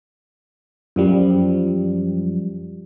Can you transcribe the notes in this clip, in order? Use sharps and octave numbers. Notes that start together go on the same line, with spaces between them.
F#2 F3 G3